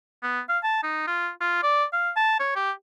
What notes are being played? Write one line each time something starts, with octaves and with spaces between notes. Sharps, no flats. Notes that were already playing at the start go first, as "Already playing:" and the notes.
B3
F5
A5
D#4
F4
F4
D5
F5
A5
C#5
G4